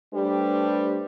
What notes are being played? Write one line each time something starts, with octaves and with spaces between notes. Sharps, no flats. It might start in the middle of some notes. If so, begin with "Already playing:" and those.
G3 A3 D4 G4 B4 C5